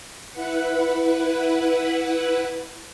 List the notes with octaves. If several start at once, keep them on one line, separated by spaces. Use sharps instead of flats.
E4 B4 F#5